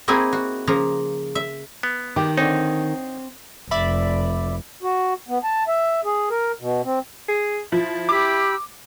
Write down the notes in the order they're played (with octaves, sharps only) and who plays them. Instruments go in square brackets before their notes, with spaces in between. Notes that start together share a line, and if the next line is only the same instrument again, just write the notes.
[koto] A#3 C4 D#4 E4 G#4 G#5
F#4
C#3 F3 A#3 A#5
E5
[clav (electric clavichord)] B3
[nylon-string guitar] D#3 [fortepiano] G4 D6
[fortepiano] D3 C#5 [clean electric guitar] C4 [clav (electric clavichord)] D#4
[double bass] F1 [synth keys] D5 E5 B5
[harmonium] F#4
B3
A5
E5
G#4
A#4
B2
C4
[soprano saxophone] G#4
[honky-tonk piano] F3 [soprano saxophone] E4
[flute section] G4 B5 E6 [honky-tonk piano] D6